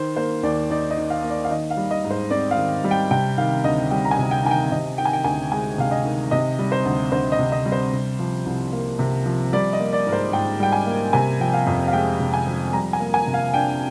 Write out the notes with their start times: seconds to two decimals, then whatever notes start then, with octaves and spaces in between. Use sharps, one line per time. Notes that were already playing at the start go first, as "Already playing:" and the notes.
Already playing: D#3 C5
0.17 A#3 C5
0.43 D#2 D5
0.70 D#4 D5
0.91 D#5
0.97 D#3
1.10 F5
1.24 A#3
1.30 D5
1.45 F5
1.50 D#3 D#5
1.71 F5
1.77 G3
1.91 D#5
2.04 G#2
2.11 C5
2.30 C4 D5
2.51 F5
2.57 D#3
2.84 G3
2.91 G5
3.11 C3 G5
3.38 D#3 F5
3.64 D2 D#5
3.91 G3 G5
4.05 A#5
4.11 G#5
4.18 C3
4.31 G5
4.45 D#3 G#5
4.51 G5
4.71 C3 D#5
4.98 D#3 G5
5.05 G#5
5.13 G5
5.24 D2 G#5
5.52 G#3 G#5
5.78 C3 F5
5.91 D#5
6.05 D#3
6.31 C3 D#5
6.59 G3
6.72 C5
6.85 D2
7.12 D2 C5
7.32 D#5
7.39 C3
7.52 D#5
7.66 G3
7.72 C5
7.92 C3
8.19 F3
8.46 C2
8.72 A#3
8.99 C3
9.26 F3
9.53 G3 D5
9.73 D#5
9.80 A#3
9.93 D5
10.06 G#2 A#4
10.13 C5
10.33 G#2 G5
10.60 G3 G5
10.72 G#5
10.86 A#3
11.13 C3 G#5
11.40 F3 G5
11.54 F5
11.66 F2
11.88 F5
11.93 G#3 G5
12.20 C3
12.34 G#5
12.47 F3
12.73 G3 A#5
12.93 G#5
13.00 A#3
13.14 G#5
13.27 C3
13.34 F5
13.54 D4 G5